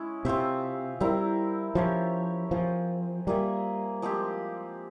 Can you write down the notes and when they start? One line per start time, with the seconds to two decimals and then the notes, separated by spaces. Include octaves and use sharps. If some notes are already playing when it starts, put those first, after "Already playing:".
Already playing: G#3 C#4 E4
0.25 C3 C4 F4 C5 E5
1.00 G3 C4 E4 A#4
1.75 F3 C#4 G4 C#5 E5
2.51 F3 C4 F4 G#4
3.27 G3 A#3 F4 G#4 E5
4.02 F3 G#3 C4 G4